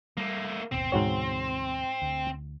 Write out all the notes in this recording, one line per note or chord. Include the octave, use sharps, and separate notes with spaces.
G3 A3 A#3
G#1 D#2 B2 C4
D2 G#2 B2 E3 F#4 C#5
D2